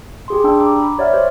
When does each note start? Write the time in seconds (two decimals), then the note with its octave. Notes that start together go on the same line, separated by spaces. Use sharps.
0.28 G4 G#4 C6
0.44 D4 G5 E6
0.60 A#5 D6
0.78 B5
0.98 G4 C#5 D5 E5 F#5 F6
1.13 G4 C5